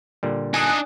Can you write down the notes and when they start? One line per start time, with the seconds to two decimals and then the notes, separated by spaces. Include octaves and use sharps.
0.23 A#2 D3 G3
0.54 D4 D#4 G#5 D#6 F#6